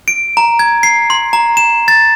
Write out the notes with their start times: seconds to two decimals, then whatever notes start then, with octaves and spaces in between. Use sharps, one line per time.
0.08 D7
0.37 A#5
0.59 G#6
0.83 C7
1.10 C6
1.33 A#5
1.57 E7
1.88 A6